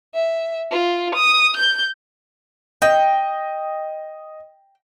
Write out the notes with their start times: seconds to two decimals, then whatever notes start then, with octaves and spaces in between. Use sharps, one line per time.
0.15 E5
0.72 F4
1.15 D#6
1.57 G6
2.82 D#5 G5